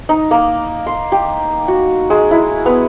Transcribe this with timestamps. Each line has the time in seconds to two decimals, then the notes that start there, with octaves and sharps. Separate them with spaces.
0.09 D#4
0.31 A#3
0.86 C6
1.12 G4
1.68 F#4
2.10 G#3
2.31 E4
2.66 B3